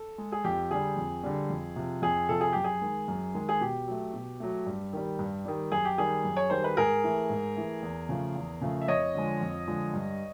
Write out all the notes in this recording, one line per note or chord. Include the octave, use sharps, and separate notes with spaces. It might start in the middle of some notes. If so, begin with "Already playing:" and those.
Already playing: A4
G#3
G#4
F2 G4
D3 G3 G#4
F2
D3 G3
F2
C3 F3
F2 G#4
C3 F3 A4
G#4
F#2 G4
G#4
D#3 G#3
F#2
D#3 G#3
G#4
B2 G4
F#3 A3
B2
F#3 A3
G2
D#3 G3
G2
D#3 G3
F#2 G#4
G4
D#3 G3 G#4
F#2
C#5
D#3 G3 C5
B4
G#2 G#4 A#4
E3 A3
G#2
E3 A3
E2
C#3 F3 A3
E2
C#3 F3 A3
E5
F2 C#5 D#5
D3 F3 G#3
F2
D3 F3 G#3
G2